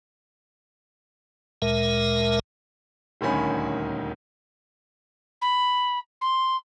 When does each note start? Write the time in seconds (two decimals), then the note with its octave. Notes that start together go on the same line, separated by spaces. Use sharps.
1.62 D2 A#2 G#3 A#4 E5
3.21 D#1 D2 D#3 C#4 G#5 B5
5.41 B5
6.21 C6